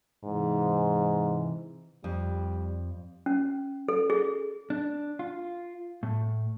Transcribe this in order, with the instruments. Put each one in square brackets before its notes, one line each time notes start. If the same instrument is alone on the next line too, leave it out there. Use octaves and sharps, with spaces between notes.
[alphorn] G#2 [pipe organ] C3 E3
[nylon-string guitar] F2 [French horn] G3
[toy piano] C#4
A4
G#4
[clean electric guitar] D4
F4
A2